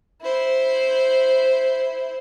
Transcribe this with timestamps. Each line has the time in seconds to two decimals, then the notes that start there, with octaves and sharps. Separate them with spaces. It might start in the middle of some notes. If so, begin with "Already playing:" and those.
0.21 E4 C5